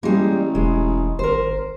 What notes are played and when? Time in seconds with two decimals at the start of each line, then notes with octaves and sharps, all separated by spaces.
0.03 A1 G3 G#3 A#3
0.55 E1 G#3
1.19 G#1 A#4 C5